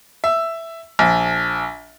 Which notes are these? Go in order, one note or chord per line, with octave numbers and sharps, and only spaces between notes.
E5
A#1